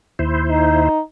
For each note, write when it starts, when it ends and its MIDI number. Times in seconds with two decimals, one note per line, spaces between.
0.19 0.89 39
0.19 0.89 64
0.19 0.89 72
0.50 1.00 63